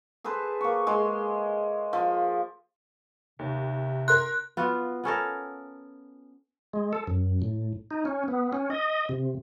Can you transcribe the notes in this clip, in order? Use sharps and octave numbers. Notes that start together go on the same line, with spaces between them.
G#4 A4 B4 C5
A#3 C#6
G#3 C6
F3
D#2 C3
A#4 C6 F#6
B3 F4 F#4
B3 C#4 A4 A#4
G#3
A4
F#2
A2
D#4
C#4
B3
C#4
D#5
C3